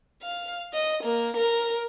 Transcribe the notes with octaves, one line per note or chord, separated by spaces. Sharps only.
F5
D#5
A#3
A#4